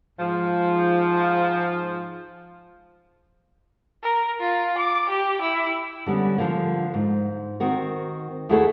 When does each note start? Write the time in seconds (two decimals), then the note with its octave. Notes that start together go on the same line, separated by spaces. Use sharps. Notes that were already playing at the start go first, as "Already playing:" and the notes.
0.19 G#2 F3
4.03 A#4
4.40 F4
4.78 D6
5.09 G4
5.41 E4
6.06 D3 G3 B3 C#4
6.38 D3 F3 A#3
6.94 G#2
7.60 D#3 C4 F#4 A#4
8.49 D#2 A3 E4 F#4 G#4 A4